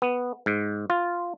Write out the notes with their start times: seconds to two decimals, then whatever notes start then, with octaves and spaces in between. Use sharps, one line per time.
0.02 B3
0.46 G#2
0.90 F4